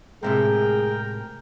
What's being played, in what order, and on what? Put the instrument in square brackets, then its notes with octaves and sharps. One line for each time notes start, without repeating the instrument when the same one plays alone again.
[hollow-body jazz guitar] A2 C3 G#3 [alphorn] G#4 [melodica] A#4 G5